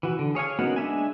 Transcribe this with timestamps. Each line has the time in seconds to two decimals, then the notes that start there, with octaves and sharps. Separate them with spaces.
0.03 E3 F#4
0.19 D3
0.35 G#4 C#5 F5 G#5
0.59 A#3 B3 C#4 D#4 F#4
0.76 G#3 D4 E5 G#5